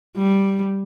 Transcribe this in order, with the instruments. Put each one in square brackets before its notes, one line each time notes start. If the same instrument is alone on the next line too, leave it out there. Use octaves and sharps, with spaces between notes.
[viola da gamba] G3